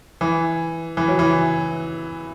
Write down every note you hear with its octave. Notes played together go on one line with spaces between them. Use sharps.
E3
E3
F#3
E3